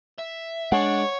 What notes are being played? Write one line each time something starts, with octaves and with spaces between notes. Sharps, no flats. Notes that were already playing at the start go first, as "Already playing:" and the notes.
E5
G#3 D4 C#5 F#5